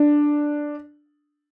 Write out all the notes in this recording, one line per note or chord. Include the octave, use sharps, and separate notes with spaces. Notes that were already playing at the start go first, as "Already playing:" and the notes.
Already playing: D4